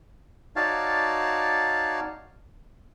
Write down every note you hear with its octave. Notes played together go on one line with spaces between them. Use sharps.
D#4 F#4 C#5 D5 F5 A5